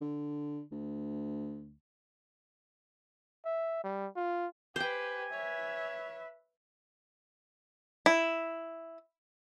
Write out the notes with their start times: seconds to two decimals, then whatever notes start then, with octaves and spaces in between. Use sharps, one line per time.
0.01 D3
0.72 D2
3.45 E5
3.84 G3
4.16 F4
4.76 G4 B4 C5 G5 G#5
5.33 B4 C#5 E5
8.06 E4